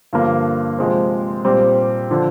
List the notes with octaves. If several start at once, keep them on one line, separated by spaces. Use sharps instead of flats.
G2 D3 F3 A#3
C3 F3 G#3 C4
A#2 G3 C4
D3 F3